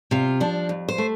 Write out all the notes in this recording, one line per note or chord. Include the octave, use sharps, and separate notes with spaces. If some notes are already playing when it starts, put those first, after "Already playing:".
C3 F4
F3 D4
F2
C5
A3